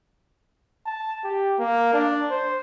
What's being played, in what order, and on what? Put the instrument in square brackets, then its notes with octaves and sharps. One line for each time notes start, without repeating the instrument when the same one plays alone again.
[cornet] A5
G4
A#3
D4
C5